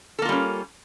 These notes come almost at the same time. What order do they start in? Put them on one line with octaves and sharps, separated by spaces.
A4 A#3 F4 G3 C#4